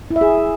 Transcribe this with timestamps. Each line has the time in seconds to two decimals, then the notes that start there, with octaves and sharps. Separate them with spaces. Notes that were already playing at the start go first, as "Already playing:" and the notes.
0.11 E4
0.16 E5
0.21 G#4